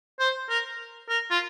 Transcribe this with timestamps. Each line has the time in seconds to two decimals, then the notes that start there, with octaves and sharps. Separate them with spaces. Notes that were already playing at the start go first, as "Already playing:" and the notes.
0.20 C5
0.49 A#4
1.09 A#4
1.30 F4